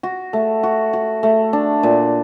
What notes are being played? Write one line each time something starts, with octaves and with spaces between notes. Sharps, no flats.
F#4
A3
F#4
F#4
A3
D4
A#2